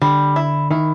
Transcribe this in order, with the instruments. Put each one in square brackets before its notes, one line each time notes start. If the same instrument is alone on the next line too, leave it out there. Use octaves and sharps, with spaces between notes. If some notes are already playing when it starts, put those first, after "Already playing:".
[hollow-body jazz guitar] D3 [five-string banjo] G3
[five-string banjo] E4
[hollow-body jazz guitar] D#3 [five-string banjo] E4